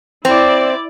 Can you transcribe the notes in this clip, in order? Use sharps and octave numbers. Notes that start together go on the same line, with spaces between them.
C4 E4 D5